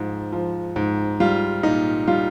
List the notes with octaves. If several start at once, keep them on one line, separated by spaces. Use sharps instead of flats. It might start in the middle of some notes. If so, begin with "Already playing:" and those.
Already playing: G#2 F3
F3
G#2
G3 F4
A#2 D#4
G3 F4